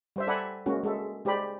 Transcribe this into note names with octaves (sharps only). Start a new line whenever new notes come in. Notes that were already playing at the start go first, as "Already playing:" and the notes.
G3 C5 E5
A4 D5 E5 F#5 G#5 B5
G#3 A#3 C#4 F#4
G#3 A4 E5
G#3 G4 C5 D5 B5